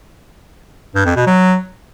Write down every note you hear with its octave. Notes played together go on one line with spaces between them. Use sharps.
G2
F2
B2
F#3